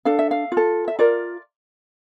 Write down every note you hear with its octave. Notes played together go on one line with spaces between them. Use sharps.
D4 A4 F5
E5
F5
F4
A4
E5
F4 A#4 D5